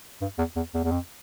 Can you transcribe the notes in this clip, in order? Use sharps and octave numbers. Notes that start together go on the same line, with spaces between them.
G2
E2
E2
E2
E2
F2